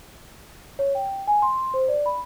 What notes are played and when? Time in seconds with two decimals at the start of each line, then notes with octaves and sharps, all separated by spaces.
0.79 C#5
0.95 G5
1.27 G#5
1.42 C6
1.74 C5
1.88 D5
2.06 B5